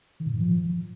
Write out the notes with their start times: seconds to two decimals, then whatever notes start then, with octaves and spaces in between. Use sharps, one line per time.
0.20 D#3
0.26 A#2
0.33 G#2
0.40 F3